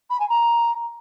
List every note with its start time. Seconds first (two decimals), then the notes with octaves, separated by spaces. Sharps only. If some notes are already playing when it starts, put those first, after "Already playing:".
0.10 B5
0.19 G#5
0.28 A#5